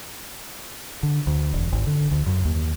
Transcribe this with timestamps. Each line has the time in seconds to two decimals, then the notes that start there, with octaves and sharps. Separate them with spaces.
1.03 D3
1.27 D2
1.54 E1
1.72 G#1
1.87 D3
2.11 D2
2.26 F#2
2.45 D#2